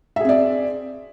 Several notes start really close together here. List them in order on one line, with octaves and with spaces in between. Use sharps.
E5 G#4 C4 D5